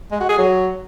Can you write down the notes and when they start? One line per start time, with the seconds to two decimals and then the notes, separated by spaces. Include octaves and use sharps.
0.11 G#3
0.20 F#4
0.29 G#4
0.38 F#3